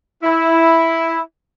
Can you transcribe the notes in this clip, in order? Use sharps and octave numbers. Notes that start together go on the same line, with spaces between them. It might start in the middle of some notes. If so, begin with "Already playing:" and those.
E4